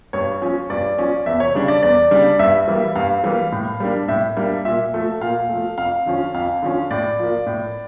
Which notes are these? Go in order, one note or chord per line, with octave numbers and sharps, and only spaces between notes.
G2 C#5
F3 C#4
G2 D5
F3 C#4
E2 E5
C#5
C#3 G3 D4
D5
E2 D5
C#3 G3 D4
G2 E5
E3 G3 A#3
G2 F5
E3 G3 A#3
A2
G3 A#3 D4
A2 E5
G3 A#3 D4
A#2 E5
F3 A3
A#2 F5
F3 A3
F2 F5
D3 F3 C#4
F2 F5
D3 F3 C#4
A2 D5
F3 A#3
A2